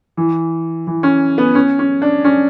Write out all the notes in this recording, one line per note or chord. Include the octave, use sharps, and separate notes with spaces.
E3
E3
C#4
B3
C#4
C#4
D4
C#4